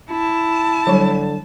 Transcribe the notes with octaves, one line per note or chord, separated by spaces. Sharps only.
E4 A5
D3 F#3 G3